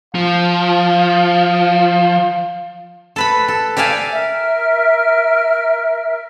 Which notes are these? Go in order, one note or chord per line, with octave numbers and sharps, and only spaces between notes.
F3 F5
A4 B4 B5
A4
G4 D5 E5 F5 G#5
A#4 E5 F6